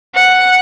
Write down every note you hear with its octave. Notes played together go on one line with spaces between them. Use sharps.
F#5